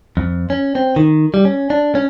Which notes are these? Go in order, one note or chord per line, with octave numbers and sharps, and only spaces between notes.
F2
C#4
C4
D#3
G3
C#4
D4
C#4